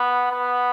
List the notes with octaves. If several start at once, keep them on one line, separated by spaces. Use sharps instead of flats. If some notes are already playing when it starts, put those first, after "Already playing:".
Already playing: B3
B3